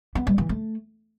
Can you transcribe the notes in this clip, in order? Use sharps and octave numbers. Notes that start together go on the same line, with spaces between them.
B3
G3
E3
A3